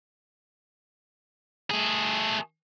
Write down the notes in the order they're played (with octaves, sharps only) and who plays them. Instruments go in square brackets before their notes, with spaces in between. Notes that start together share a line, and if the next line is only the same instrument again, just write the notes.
[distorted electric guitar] A3 G#4